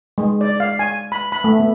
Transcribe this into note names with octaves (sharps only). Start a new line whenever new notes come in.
G#3
D5
F5
G#5
B5
B5
A3
B3